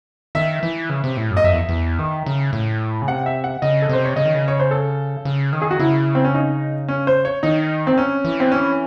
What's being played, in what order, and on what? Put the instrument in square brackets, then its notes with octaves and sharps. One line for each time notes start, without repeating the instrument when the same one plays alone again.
[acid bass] D#3 [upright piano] E5
[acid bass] E3
C#3
C3
A2
F#2
[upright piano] D#5
[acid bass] F#2 [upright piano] E5
[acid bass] E2
E2
D#3
C#3
A2
C#3
[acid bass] C3 [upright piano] F#5
[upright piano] E5
F#5
[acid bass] C#3 [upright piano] D#5
[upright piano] A4
[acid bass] C3 [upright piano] C5
[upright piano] C#5
[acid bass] C#3 [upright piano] D#5
[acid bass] D#3
C#3
[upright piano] C#5
C5
A4
[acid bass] C#3
D#3
[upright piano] G#4
F#4
[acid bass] C#3 [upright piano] E4
[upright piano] C4
C#4
D#4
C#4
C5
C#5
[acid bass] D#3 [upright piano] D#4
[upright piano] C4
C#4
[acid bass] E3
[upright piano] C4
C#4